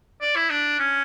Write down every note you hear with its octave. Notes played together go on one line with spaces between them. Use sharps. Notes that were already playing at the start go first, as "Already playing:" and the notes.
D5
E4
D4
C#4